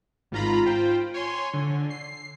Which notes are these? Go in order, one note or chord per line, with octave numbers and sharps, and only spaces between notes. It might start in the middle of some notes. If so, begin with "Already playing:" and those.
G#1 G#2 F4 A#5 B5
F4 C5 G5
C#5 G#5 C6
D3
C7